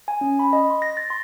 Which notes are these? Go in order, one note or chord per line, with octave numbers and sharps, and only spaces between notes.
G#5
C#4
B5
D#5
C6
A#6
A6
C6